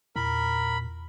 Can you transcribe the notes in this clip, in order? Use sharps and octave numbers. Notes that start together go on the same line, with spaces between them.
E2 A#2 A#4 A#5 B5